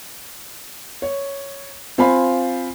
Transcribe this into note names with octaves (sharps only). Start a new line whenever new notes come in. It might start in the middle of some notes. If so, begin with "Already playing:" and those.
C#5
C4 F4 C5 F5 G#5 B5